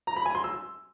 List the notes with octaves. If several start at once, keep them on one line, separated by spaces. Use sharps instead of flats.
A#5
B5
G#5
C6
E6